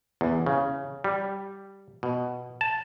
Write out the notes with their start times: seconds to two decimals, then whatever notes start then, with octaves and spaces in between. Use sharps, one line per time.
0.21 E2
0.46 C#3
1.04 G3
2.03 B2
2.61 A5